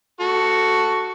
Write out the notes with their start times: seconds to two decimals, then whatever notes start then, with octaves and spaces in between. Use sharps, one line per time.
0.21 F#4 A4